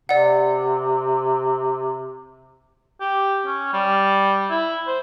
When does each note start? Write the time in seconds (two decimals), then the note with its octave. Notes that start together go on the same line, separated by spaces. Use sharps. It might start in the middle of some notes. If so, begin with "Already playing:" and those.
0.09 C3 D5 F#5
3.01 G4
3.46 C#4
3.73 G3
4.50 E4
4.87 C5